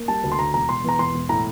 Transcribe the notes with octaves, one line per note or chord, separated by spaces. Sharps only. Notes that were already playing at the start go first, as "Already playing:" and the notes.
Already playing: A#3
G3 A5
D2
C6
D2 A#5
E1 A#5
E1 C6
E2 A#5
E1 C6
E1
A2 A#5